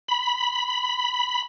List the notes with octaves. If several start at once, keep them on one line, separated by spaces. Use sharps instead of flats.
B5